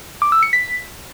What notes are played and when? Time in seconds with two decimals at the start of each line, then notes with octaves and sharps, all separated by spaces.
0.22 D6
0.32 E6
0.43 C#7
0.53 B6